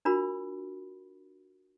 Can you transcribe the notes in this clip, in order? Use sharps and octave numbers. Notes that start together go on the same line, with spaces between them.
D4 F4 F#4 A#4 B5